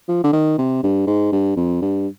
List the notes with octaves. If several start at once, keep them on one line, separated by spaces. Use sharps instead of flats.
F3
D3
D#3
C3
G2
G#2
G2
F2
G2